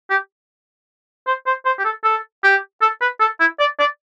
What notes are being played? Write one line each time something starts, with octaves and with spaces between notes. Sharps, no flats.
G4
C5
C5
C5
G4
A4
A4
G4
A4
B4
A4
E4
D5
D5